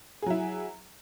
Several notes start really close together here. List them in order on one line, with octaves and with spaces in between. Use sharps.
G#4 F#3 E4